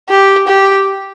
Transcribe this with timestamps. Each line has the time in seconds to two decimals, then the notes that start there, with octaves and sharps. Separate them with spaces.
0.10 G4
0.48 G4